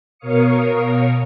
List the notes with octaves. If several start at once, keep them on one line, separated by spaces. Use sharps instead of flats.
B2 A#4 C#5 F5 D#6 C#7